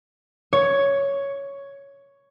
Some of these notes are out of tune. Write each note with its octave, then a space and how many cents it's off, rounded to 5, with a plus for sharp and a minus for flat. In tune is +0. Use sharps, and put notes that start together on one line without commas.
C#5 +5